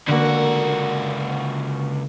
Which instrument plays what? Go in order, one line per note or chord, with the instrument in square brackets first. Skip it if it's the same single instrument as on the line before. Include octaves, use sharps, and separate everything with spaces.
[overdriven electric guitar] C#2 F#4 [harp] D3 A#3